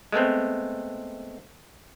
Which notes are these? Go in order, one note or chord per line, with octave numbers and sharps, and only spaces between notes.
G#3 A3 B3 C4